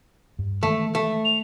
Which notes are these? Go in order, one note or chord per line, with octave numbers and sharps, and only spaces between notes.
G2
D#3 E3 G#3 A3
A3
F7